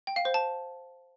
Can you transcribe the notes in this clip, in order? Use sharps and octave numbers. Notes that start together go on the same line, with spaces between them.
G5
F5
C5
A5